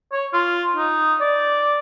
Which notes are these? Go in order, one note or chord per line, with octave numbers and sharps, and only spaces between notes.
C#5
F4
D#4
D5